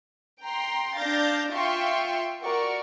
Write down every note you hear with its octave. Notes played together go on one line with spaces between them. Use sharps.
G5 A#5 C6
D4 F5 G6 A6 A#6
F4 E5 G5 C6 C#6
F#4 A#4 D5 C#6